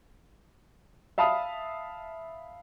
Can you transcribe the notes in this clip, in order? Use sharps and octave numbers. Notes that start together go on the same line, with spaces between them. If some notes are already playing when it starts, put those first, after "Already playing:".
E5 F5 A5 B5 D#6